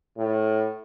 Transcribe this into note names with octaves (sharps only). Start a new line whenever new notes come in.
A2